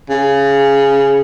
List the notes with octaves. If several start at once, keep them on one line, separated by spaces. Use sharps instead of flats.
C#3